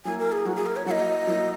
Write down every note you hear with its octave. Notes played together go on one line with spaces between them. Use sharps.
F#3 A#3 E4 G#5
A#4
G#4
F#3 A#3 E4 F#4
G#4
A#4
C#5
F#3 A#3 E4 D#5 F#5
F#3 A#3 E4